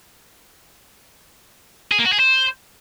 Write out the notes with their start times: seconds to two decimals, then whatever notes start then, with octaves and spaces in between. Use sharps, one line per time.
1.91 G#4
1.98 A#3
2.05 F#4
2.12 G#4
2.19 C5